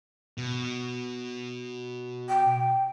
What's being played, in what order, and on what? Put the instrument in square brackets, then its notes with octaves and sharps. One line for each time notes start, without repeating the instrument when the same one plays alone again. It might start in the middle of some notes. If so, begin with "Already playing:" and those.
[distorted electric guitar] B2
[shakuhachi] G5